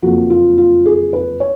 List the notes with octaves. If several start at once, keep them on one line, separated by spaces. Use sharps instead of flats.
F#1 F2 F3 A#3 F#4
F4
F4
G#4
B4
C#5